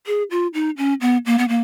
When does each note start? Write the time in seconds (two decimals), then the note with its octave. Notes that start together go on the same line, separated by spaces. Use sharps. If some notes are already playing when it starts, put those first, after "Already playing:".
0.07 G#4
0.31 F4
0.54 D#4
0.77 C#4
1.01 B3
1.26 A#3
1.38 B3
1.48 A#3